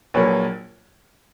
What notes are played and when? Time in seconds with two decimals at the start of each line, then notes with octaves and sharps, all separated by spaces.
0.14 A#1 A#2 F#3 A#3 B4 C#5